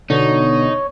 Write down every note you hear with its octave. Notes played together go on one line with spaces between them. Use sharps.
B2 D3 D#4 C#5